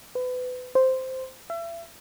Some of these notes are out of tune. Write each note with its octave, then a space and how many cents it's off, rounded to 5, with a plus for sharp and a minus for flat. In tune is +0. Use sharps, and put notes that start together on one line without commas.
B4 +30
C5 -5
E5 +35